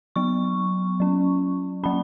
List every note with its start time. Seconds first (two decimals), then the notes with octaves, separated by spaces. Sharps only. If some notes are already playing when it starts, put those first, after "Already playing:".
0.16 F#3 B3 C#6
1.00 F#3 C#4
1.83 F#3 A#3 C#4 B5